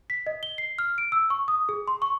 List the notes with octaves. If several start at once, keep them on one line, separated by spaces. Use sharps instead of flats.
B6
D#5
G7
C7
F6
D7
E6
C#6
D#6
G#4
C6
C#6